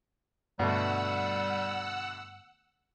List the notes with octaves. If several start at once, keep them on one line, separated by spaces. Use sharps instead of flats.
G2 B2 D3 G3 A3 F#5 E6